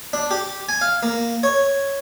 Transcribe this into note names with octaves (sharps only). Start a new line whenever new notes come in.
D4
G4
G#5
F5
A#3
C#5